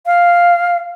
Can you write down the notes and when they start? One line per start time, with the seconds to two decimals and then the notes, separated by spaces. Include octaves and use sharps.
0.06 F5